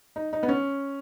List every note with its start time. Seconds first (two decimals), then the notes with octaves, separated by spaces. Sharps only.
0.16 D#4
0.33 D#4
0.43 B3
0.48 C#4